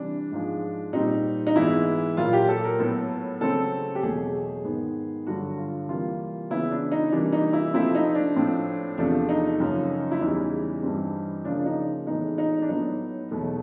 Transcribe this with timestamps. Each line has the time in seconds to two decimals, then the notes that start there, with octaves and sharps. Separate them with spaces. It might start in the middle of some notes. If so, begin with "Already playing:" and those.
Already playing: C3 E3 G3 D4
0.32 G#2 F3 G#3
0.93 A#2 G3 C4 D#4
1.47 D#4
1.56 G#2 E3 G#3 B3 E4
2.17 A#2 F#3 A#3 F4
2.33 G4
2.49 A4
2.64 A#4
2.79 A2 F#3 B3 A4
3.41 C#3 F#3 A3 C4 A4
3.95 G4
4.03 E2 B2 F#3 A3 G#4
4.65 G#2 D#3 G#3 B3
5.27 G2 D3 F#3 F#4
5.58 F4
5.89 C3 E3 G3 A#3 F4
6.50 C#3 E3 G#3 B3 E4
6.71 D4
6.92 D#4
7.12 C3 E3 G3 A#3 D4
7.33 D#4
7.53 E4
7.74 C3 F3 A3 C4 E4
7.95 D#4
8.15 D4
8.36 A2 F3 A3 C4
8.98 E2 C3 F3 A3 D4
9.29 D#4
9.60 F#2 C#3 F3 G#3
10.11 E4
10.21 E2 C#3 E3 G3 D#4
10.83 G2 E3 G3 C4
11.45 C#3 F3 A#3 D4
11.59 D4
11.65 D#4
12.07 A2 E3 G#3 B3 D#4
12.38 D#4
12.62 D4
12.69 A2 F#3 B3 D#4
13.31 E2 B2 F#3 A3